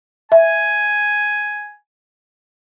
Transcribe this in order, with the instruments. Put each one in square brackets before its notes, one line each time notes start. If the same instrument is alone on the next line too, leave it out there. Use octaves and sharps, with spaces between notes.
[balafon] E5 [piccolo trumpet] G#5